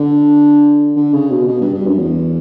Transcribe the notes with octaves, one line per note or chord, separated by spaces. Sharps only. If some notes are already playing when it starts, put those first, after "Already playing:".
Already playing: D3
D3
C#3
B2
B2
G2
G2
F#2
E2